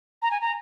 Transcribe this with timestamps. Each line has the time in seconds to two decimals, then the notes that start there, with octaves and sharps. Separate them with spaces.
0.22 A#5
0.31 G#5
0.41 A#5